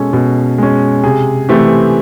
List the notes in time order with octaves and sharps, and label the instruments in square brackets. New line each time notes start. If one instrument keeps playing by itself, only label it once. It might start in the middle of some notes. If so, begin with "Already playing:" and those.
Already playing: [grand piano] B2 G#3 C#4 A4
B2
G#3 C#4
C3 G#4
E3 A3 C4 G4